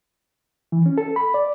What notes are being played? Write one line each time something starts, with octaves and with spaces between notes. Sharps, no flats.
E3
C#4
A4
B5
D5